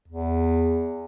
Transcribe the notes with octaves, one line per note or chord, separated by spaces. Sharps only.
E2